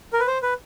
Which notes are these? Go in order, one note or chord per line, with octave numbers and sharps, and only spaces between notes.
A#4
B4
C5
B4